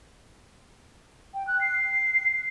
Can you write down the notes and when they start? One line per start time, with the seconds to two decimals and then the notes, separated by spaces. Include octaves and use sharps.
1.34 G5
1.47 F#6
1.61 C7